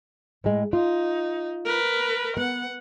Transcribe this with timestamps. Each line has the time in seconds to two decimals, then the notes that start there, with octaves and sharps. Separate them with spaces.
0.44 A2 G#3
0.73 D#4 F4
1.66 A#4 B4
2.37 B3 F#5